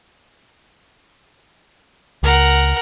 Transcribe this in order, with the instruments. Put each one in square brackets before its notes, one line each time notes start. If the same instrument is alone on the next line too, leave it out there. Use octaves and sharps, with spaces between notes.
[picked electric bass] C#2 [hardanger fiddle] A#4 F#5